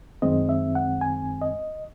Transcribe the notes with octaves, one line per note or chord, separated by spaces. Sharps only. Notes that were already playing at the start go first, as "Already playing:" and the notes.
F#2 D#3 G#3 C4 D#5
E5
F#5
G#5
D#5